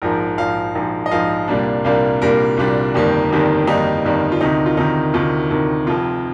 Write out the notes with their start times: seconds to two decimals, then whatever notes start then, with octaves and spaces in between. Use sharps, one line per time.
0.02 A#1 G#2 F3 A#4
0.38 A#1 G#2 F3 F5
0.75 A#1 G#2 F3
1.06 D#5
1.11 A#1 G#2 F3 F5
1.48 C2 A#2 G3 A#3 D4
1.84 C2 A#2 G3 A#3 D4 F5
2.22 C2 A#2 G3 A#3 D4 A#4
2.57 C2 A#2 G3 A#3 D4
2.94 G1 F2 D#3 G3 A#3 G4
3.31 G1 F2 D#3 G3 A#3
3.67 G1 F2 D#3 G3 A#3 D#4
4.04 G1 F2 D#3 G3 A#3
4.32 F4
4.41 D2 C3 D#3 D#4
4.66 F4
4.77 D2 C3 D#3 D#4
5.14 D2 C3 D#3 F4
5.51 D2 C3 D#3
5.87 F1 F2 C3 F4